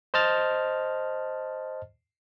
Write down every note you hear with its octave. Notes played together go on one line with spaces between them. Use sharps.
C5 D#5 A5 F6 A6